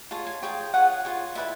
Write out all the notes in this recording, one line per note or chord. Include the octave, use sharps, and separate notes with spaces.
F4 G#4 C#5 A5
G#5
F4 G#4 C#5 G5
F4 G#4 C#5 F#5
F4 G#4 C#5
E4 G#4 B4 D5 E5